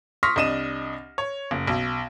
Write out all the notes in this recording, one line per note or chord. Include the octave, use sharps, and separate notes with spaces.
C6 C#6 D#6 F6 A#6 B6
C2 D4 D#5 D#7 E7
C#5
F#1
B1